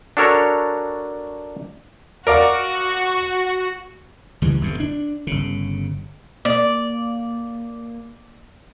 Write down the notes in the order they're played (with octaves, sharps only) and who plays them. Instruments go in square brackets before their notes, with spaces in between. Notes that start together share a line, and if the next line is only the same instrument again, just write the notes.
[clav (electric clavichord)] D4 F#4 A4 A#4 C#5
[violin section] F#4 [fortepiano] A#4 D5 F5
[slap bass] C#2 E3 G3
G1 F2 C3
D4
G1 C#3
[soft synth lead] A#3 [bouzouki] D5